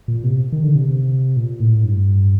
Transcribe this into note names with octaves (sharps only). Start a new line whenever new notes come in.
A#2
C3
D#3
D3
C3
C3
A#2
A2
G2